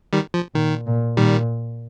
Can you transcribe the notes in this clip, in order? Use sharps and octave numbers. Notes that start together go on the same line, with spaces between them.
D#3 G3
F3
A#2 D#3
A#2
A#2 D#3 G3